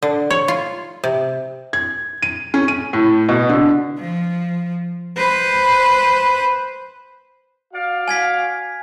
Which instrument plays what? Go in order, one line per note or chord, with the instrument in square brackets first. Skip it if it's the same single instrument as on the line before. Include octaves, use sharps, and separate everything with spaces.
[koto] D3
C#5
F4
C3
[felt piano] G#6
D#7
C#4
D#7
A2
B2
D3
[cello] F3
B4 C5
[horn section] F#4 D5 F5
[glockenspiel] G#5 G#6 B6